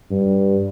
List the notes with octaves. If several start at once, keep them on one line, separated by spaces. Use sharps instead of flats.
G2